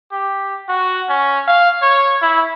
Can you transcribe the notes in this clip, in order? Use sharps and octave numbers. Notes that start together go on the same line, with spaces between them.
G4
F#4
C#4
F5
C#5
E4